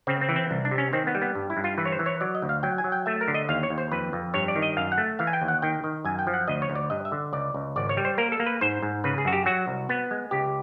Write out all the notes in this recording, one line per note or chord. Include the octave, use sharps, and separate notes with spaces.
C#3 C4
C4
E3
C4
C2
D4
C3
C#4
D#3 C4
B3
G3
B3
G2
E4
G2
F4
E3 B4
C#5
C5
E3
C#5
F#3 D5
D#5
D2
F5
F#3 G5
G#5
F#3
G5
A3 E5
A#4
D3
D#5
D#2 F5
C#5
D#2
C5
F2 B4
F2
G2 C#5
D5
D#3
D#5
F#2 F5
F#5
A3
E3 F5
G#5
G5
D#2
F#5
D#3 G5
D#3
F#2 G#5
G5
F3
F#5
D2 D#5
C#5
D2
D5
G2 D#5
E5
D3
C#2 D5
C#2
G#1 D5
C#5
G3
C5
A#3 A#4
A4
A#3
B4
G#2 C5
G#2
C#3 B4
G#4
F#2 F#4
G4
F#3 F#4
C2
B3
G#3
C#2 G4